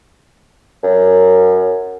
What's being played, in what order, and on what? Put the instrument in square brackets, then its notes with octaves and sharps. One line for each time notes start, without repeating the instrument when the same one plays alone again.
[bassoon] F#2